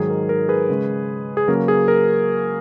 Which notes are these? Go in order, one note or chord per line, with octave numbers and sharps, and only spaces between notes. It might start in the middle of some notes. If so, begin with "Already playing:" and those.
Already playing: G#2 D#3 F#3 G#4
A#4
A#4
G#4 B4
C#3 G#3 C#4
G#4
C#3 F#3 A#3 C#4 A#4
G#4
A#4